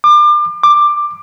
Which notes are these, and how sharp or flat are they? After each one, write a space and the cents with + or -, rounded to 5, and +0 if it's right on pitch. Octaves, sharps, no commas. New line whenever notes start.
D6 +35
D6 +15